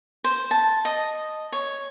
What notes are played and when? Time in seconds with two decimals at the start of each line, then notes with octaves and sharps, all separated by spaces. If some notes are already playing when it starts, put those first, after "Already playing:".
0.24 C5
0.51 A5
0.85 D#5
1.52 C#5